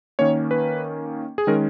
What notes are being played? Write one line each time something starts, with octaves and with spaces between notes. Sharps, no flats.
D#3 A#3 C#4 C#5
B4
G#4
D#3 G#3 C#4 A#4